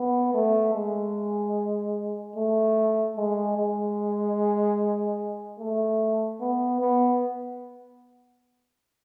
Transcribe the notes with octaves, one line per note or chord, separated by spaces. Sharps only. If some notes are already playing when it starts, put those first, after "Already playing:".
Already playing: B3
A3
G#3
A3
G#3
G#3
A3
B3
B3